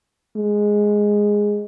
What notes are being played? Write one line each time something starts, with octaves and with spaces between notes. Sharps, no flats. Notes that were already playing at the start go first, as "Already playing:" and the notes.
G#3